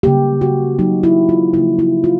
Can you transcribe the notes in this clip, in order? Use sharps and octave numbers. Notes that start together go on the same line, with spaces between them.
C#3 F#3 A#3 G4
F#4
C#3 F#3 A#3 D#4
E4
F4
C#3 F3 A#3 E4
E4
F4